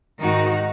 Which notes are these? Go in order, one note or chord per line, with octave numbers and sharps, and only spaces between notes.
G#2 D#3 D#4 F#4